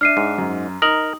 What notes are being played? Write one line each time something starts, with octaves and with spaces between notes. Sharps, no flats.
D4 E5 F6 C7 D#7
G#2
F#2
D#4 A#4 D#6 F#7